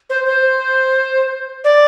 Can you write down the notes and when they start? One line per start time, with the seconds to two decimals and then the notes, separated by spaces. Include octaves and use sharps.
0.10 C5
0.25 C5
1.64 D5